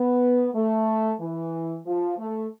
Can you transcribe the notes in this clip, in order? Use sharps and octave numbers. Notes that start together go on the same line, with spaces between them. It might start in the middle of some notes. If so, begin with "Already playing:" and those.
Already playing: B3
A3
E3
F3
A3